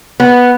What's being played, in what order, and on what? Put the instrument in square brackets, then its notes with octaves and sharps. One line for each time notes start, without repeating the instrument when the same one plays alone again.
[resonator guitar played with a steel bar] B3